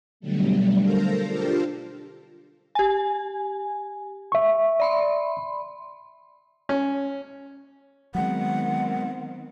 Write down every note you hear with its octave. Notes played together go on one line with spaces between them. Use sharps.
B2 D3 F#3 G3 A3
A4 A#4 C5 F5 A#5
D4 F4 G4 A4 A#4 C5
G4 G#5
E5 C#6
D5 B5 C6
C#4
D#3 F#3 G#3 B3 C4 F#5